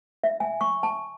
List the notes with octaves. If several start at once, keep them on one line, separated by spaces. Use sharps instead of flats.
E5
G#5
C#6
A5